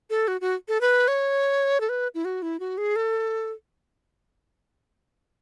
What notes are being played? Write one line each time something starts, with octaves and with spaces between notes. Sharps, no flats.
A4
F#4
F#4
A4
B4
C#5
A4
B4
E4
F#4
E4
F#4
G#4
A4